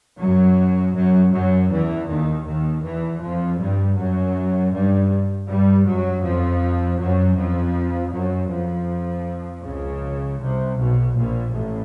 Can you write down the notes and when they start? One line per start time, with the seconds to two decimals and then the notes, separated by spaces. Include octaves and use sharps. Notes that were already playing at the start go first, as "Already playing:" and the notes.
0.19 F#2 F#3
0.94 F#2 F#3
1.32 F#2 F#3
1.69 E2 E3
2.07 D#2 D#3
2.45 D#2 D#3
2.83 E2 E3
3.22 F2 F3
3.58 G2 G3
3.97 F#2 F#3
4.72 G2 G3
5.48 G2 G3
5.85 F#2 F#3
6.24 F2 F3
6.99 F#2 F#3
7.37 F2 F3
8.12 F#2 F#3
8.50 F2 F3
9.64 C#2 C#3
10.39 C2 C3
10.77 B1 B2
11.15 A#1 A#2
11.52 A1 A2